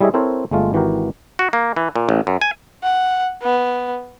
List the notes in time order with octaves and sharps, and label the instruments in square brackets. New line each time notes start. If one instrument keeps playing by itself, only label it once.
[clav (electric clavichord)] G3 E4 G#4 C#5 D#5 E5
C4 E4 A4 A#4 C5 C#5
G1 G#3 A3 F4
G#1 E3 F#4 G4 A#4
F#4
A#3
E3
A#2
A1
F#2
G#5
[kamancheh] F#5
B3